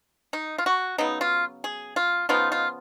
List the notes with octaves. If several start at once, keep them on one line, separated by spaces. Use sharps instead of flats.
D#4
F4
F#4
C#3 F#3 B3 D#4
F4
G#4
F4
C#3 F3 B3 D#4 F4
F4